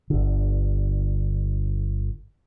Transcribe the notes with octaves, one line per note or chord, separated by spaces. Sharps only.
G1 D3